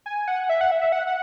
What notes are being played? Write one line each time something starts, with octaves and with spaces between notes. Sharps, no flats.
G#5
F#5
E5
F#5
E5
E5
F#5
F#5